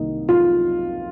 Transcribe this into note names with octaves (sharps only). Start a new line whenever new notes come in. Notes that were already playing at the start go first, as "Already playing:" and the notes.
Already playing: C2 C3 D#3 A#3 D#4
F4